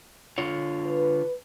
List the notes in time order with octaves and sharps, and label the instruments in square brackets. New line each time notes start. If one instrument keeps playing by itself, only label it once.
[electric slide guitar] D3 F4 C#5
[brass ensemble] B4